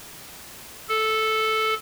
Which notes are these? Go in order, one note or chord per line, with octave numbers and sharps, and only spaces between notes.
A4